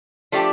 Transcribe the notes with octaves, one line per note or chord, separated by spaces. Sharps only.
F3 A3 D4 G4